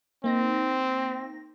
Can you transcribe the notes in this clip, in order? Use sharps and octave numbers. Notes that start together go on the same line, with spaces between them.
A#3 C4 D#4 A#6